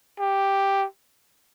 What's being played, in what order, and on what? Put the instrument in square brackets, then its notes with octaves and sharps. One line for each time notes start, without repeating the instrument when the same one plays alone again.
[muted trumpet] G4